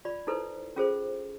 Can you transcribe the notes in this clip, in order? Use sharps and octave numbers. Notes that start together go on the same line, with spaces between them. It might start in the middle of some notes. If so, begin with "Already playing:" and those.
F4 D5 B5
D#4 E4 A4 B4 C5
C#4 F4 G#4 A4 C5